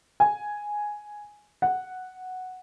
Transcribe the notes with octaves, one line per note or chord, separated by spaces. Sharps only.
G#5
F#5